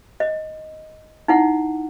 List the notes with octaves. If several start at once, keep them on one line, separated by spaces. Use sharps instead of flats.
D#5
D#4 E4 F#5